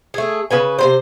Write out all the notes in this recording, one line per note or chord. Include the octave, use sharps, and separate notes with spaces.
A3 G#4
C#3 B4 G#5
C3 E3 C5